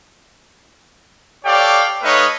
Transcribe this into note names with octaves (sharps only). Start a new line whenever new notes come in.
G4 A4 C#5 D5 F5 G5
A3 D#4 B4 C#5 D#5 F5